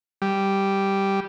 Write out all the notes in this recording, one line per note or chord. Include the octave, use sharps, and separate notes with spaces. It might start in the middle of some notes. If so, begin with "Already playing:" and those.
G3